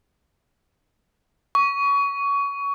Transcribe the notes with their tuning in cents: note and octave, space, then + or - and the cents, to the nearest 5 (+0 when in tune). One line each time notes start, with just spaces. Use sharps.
C#6 +25